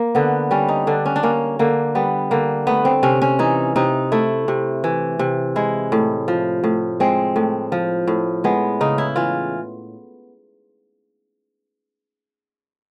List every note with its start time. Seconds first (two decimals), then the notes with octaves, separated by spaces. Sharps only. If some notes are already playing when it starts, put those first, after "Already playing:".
Already playing: A#3
0.15 D3 B3
0.51 G3 C#4
0.69 D#4
0.87 D3 D4
1.06 C#4
1.16 D4
1.23 A#3 C#4
1.59 D3 A#3
1.95 G3 B3
2.31 D3 A#3
2.67 A3 B3
2.85 C4
3.03 C3 C#4
3.22 C#4
3.39 E3 D#4
3.76 C3 D#4
4.12 A3 E4
4.48 C3
4.84 E3
5.19 C3
5.56 G#3 E4
5.92 A2
6.28 F3
6.64 A2
7.00 G#3 C4
7.36 A2
7.72 F3
8.07 A2
8.44 G#3 B3
8.81 C#3 D#4
8.98 E4
9.16 E3 F4